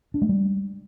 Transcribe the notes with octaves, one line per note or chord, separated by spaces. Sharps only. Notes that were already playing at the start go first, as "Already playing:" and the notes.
D4
G#3
G3